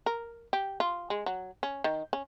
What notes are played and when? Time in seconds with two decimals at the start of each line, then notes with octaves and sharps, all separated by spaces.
0.06 A#4
0.53 G4
0.80 F4
1.10 G#3
1.26 F#3
1.63 C#4
1.84 D#3
2.13 C#4